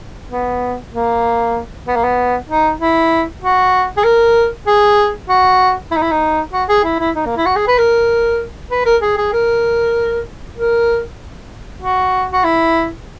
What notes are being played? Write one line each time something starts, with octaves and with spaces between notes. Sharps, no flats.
B3
A#3
B3
A#3
B3
D#4
E4
F#4
G#4
A#4
G#4
F#4
E4
D#4
E4
D#4
F#4
G#4
E4
E4
D#4
A#3
E4
F#4
G#4
B4
A#4
B4
A#4
G#4
G#4
A#4
A#4
F#4
F#4
E4